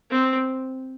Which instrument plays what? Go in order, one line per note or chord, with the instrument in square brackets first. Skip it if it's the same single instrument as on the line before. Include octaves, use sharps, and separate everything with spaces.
[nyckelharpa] C4